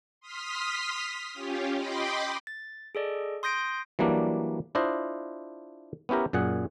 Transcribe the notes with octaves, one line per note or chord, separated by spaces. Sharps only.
C6 D#6 F6 B6
C#4 F4 G4
D#5 G5 B5 C6 D6
A6
G#4 A4 D5 D#5
C6 D#6 G6 A#6 C7 D7
E3 F#3 G3 A#3 D4
D4 E4 F4 C5 D#5
B3 C#4 E4 G4 A#4
F#2 A#2 G#4 F#5